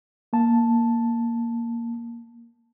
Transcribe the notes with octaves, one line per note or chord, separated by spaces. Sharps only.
A#3 A5